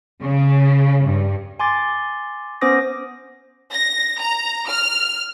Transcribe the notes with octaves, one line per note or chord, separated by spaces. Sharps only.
C#3
G2
G#5 C6 D6 A6
B3 C#4 C5 D6 D#6 A#6
A#6
A#5
F6